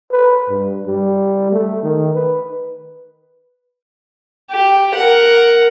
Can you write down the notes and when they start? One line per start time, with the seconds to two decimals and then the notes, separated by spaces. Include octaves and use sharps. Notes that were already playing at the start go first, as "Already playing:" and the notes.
0.11 B4
0.50 G2
0.87 G3
1.52 A3
1.83 D#3
2.14 B4
4.51 G4
4.95 A#4 F#5